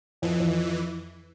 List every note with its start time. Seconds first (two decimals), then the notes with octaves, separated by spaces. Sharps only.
0.22 F2 E3
0.40 F2